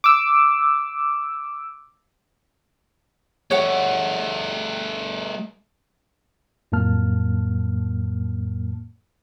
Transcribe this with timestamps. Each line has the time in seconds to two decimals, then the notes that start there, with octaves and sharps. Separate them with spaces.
0.04 D6 E6
3.51 G3 A3 C#5 F#5
6.72 F2 A2 F#3 A#3 A5 F6